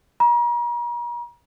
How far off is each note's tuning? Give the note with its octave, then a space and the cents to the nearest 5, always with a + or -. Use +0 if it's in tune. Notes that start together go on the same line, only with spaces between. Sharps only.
A#5 +40